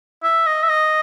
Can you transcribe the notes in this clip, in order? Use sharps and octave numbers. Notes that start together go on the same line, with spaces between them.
E5
D#5
E5
D#5